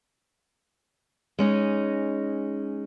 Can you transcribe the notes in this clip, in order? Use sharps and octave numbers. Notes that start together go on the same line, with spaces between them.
G#3 C#4 D#4